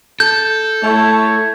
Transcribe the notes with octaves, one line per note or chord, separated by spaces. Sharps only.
A4 G6
A3 E4 C#5